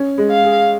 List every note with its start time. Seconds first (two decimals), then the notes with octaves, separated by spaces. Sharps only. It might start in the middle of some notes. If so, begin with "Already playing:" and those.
Already playing: C#4
0.18 G#3
0.31 F5
0.44 G#4